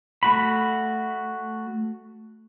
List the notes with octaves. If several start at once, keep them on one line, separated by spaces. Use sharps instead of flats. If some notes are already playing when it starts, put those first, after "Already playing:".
A3 F#4 B5